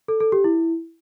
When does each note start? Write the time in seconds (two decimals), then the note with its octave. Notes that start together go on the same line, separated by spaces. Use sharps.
0.08 A4
0.20 A4
0.32 G4
0.44 E4